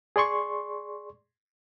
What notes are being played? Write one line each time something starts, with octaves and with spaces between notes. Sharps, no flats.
G#4 D5 C6 C#6